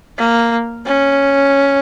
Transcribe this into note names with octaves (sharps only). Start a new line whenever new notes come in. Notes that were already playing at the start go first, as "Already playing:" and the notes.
A#3
C#4